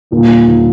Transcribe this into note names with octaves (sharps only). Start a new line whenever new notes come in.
D#2 A#2 D3 G3 A#3
D#2 D3 G3 A#3